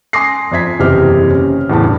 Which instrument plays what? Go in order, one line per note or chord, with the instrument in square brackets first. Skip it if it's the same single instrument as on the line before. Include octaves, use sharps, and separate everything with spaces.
[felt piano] G#5 C6 D6 D#6 A#6 C7
F2 E5 G#6 B6
F#1 E2 C3 G4 F6
C#4
E2 A2 C#3 A5
G2